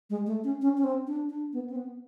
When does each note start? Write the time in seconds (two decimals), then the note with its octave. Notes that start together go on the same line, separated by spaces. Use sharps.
0.10 G#3
0.26 A3
0.44 C#4
0.62 C#4
0.78 C#4
0.84 C4
1.07 D4
1.30 D4
1.53 B3
1.70 C4
1.76 B3